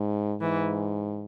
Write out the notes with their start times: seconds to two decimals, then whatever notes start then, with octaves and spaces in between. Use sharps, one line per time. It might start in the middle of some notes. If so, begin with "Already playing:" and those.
Already playing: G#2
0.41 G#2 E3